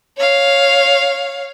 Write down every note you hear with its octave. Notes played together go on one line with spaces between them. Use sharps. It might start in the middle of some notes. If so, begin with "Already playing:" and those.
C#5 F5